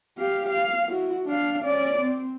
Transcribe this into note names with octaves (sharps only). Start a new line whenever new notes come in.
G4 F5
F5
E4 F#4
D4 F5
C#4 D5
C4